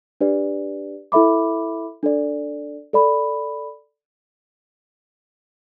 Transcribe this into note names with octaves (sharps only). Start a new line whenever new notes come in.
D4 G4 B4 D5
E4 A4 E5 B5 D6
D4 A4 D5
A4 D5 B5